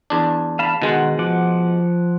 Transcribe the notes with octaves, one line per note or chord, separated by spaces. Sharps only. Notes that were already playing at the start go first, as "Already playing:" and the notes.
E2 D4
F5 A5 B5
B2 D#3 G#3 F#5
F3 F#5 D6